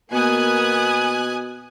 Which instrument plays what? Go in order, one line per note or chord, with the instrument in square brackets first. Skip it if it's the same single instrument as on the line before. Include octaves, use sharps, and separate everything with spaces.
[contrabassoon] B2 [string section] A#3 [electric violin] B3 D#6 [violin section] G#5 F#6 G#6